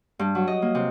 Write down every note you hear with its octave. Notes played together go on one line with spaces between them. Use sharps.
G2
F#3
D#5
A#3
C3